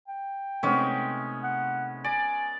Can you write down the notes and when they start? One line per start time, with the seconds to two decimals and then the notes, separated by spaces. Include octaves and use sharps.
0.08 G5
0.63 C3 G#3 A3 B3 C#4 D#4
1.43 F#5
2.04 D5 G#5